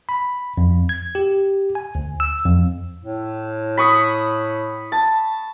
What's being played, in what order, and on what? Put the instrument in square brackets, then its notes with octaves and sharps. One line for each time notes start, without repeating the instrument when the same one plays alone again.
[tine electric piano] B5
F2
G#6
G4
G#5
D2
E6
F2
[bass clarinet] A2
[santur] B5 C#6 D#6
A5